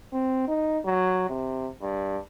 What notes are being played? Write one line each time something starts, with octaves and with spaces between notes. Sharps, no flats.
C4
D#4
F#3
C3
G2